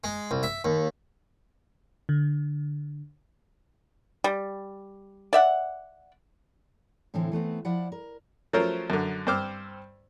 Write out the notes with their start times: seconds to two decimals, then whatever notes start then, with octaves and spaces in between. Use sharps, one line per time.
0.04 G#3
0.31 C2
0.43 E5
0.65 D#2
2.09 D3
4.24 G3
5.33 D5 E5 F#5
7.14 A2 D3 E3 C4 E4
7.32 E3 A3 B3 C4
7.65 F3 E4 D5 F#5
7.92 A#4
8.53 F3 F#3 A3 C#4 A#4 C5
8.90 F#2 D3
9.27 G2 C4 C5 D6 E6 F6